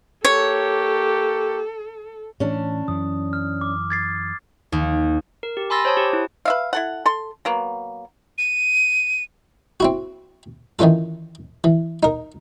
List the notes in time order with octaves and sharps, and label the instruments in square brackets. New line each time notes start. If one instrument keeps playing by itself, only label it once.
[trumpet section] A#3 G4 [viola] A4 [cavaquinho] C#5
[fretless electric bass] A2 E3 [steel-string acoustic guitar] C#4 D4
[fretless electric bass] F#2 E3 [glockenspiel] D#6
[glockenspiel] F6
D6
G#6 A6 C7
[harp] D#2
[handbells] A#4
G4
G#5 B5 C6 E6 A6 A#6
C5 C#5 A5 D#6
G4
E4
[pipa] B4 E5 F5
E4 A4 F#5
A4 C6
F#3 A#3 B3
[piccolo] D#7
[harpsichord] C4 E4 F#4
D#3 E3 C#4 F4 A4
E3
D#4 A#4